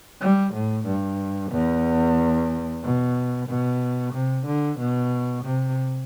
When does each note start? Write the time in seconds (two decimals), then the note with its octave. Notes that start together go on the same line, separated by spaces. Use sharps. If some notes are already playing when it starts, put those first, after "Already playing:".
0.21 G3
0.53 A2
0.86 G2
1.52 E2
2.83 B2
3.48 B2
4.13 C3
4.46 D3
4.79 B2
5.44 C3